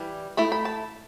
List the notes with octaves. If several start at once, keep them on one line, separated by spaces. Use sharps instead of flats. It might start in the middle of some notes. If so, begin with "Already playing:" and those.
Already playing: E3 G3
A3 E4 B5
B5
A5